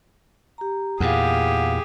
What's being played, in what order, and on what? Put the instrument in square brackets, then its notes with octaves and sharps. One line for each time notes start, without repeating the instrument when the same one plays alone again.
[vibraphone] G4 A#5
[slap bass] E2 A#2 [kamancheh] G4 G#4 [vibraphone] F5 F#5